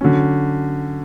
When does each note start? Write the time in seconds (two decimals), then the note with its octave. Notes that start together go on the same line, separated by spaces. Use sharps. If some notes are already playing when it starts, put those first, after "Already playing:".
0.01 D3 F#3 C#4